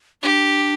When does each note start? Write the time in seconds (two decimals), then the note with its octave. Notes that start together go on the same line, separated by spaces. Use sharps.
0.23 D4 G4